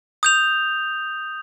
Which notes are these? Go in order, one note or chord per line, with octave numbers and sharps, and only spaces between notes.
D#6 G6 F7